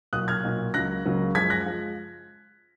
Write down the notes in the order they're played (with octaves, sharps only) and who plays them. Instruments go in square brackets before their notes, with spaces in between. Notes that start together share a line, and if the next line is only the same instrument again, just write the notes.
[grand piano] B1 A#2 F#3 A#3 D#6 F#6
F6 G#6
B1 A#2 F#3 A#3
C#2 C#3 F#3 A#3 F#6 A#6
C#2 C#3 F#3 A#3
F#2 F3 G#3 G#6 B6
F#6 A#6
F3 G#3